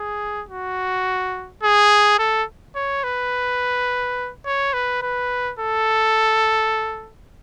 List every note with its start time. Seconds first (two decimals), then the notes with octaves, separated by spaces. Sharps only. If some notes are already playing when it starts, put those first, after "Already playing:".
Already playing: G#4
0.49 F#4
1.63 G#4
2.19 A4
2.75 C#5
3.04 B4
4.46 C#5
4.73 B4
5.02 B4
5.59 A4